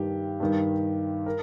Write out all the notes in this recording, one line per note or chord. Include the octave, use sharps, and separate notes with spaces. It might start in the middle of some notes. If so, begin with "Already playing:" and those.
Already playing: G2 D#3 G4
G2 D#3
A#4